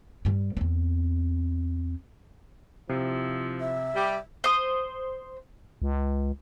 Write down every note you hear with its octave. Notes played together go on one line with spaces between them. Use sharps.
G2 G3
E2 C4
C3 F3 E4
E5
G3 G4
C5 D#6
C#2